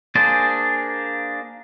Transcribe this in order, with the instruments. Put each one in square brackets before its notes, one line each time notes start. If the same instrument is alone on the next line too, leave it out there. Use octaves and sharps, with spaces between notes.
[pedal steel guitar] A#3 D4 G#4 C5 D5